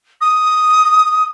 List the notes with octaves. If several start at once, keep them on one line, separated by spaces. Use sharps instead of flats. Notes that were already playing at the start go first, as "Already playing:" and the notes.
D#6